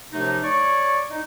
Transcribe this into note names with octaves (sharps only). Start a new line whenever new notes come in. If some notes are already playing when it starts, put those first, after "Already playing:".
F#2 C3 F3 A3 D#4
C#5 D5 C#6
D#4